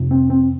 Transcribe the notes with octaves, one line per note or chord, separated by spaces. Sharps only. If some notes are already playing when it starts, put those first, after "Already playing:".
Already playing: F2 C3
C4
C4